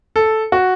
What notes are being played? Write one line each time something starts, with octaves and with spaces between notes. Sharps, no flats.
A4
F#4